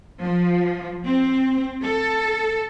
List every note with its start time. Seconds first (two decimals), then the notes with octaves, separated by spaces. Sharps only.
0.23 F3
1.06 C4
1.85 A4